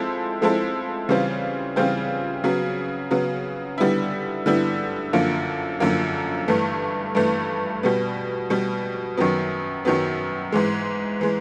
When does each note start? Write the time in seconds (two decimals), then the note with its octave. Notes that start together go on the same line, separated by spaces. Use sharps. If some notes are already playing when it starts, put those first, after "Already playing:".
Already playing: F3 G#3 C4 E4 A4
0.42 F3 G#3 C4 E4 A4
1.09 C#3 E3 G3 C4 F4
1.76 C#3 E3 G3 C4 F4
2.44 C#3 F#3 B3
3.11 C#3 F#3 B3
3.78 D3 G3 B3 E4
4.46 D3 G3 B3 E4
5.13 F#2 D3 F3 A#3
5.80 F#2 D3 F3 A#3
6.48 G2 E3 A3
7.15 G2 E3 A3
7.83 B2 G3 B3
8.50 B2 G3 B3
9.17 F#2 D#3 F#3 B3
9.85 F#2 D#3 F#3 B3
10.52 G#2 E3 G#3
11.21 E3 G#3